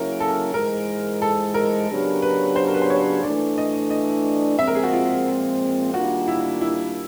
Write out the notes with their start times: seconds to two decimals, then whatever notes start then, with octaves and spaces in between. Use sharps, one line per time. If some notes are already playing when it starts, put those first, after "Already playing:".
Already playing: C#3 F#3 A#3 C#4 E4 A#4
0.20 A4
0.54 G#2 E3 G#3 A#4
1.22 A4
1.54 A#4
1.88 C#3 F#3 B3 D4 G4
2.22 B4
2.56 C5
2.67 A#4
2.74 B4
2.82 C5
2.90 C#5
3.23 E3 A3 D4 D5
3.58 D#5
3.91 D#5
4.58 A#2 F3 G#3 C4 E5
4.67 A#4
4.75 G#4
4.83 F#4
4.92 F4
5.94 D#3 G3 A#3 D4 F4 F#4
6.28 E4
6.61 E4